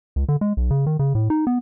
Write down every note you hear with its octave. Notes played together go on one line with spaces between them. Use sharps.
C#2
D3
G#3
B1
C#3
D#3
C#3
A2
D#4
B3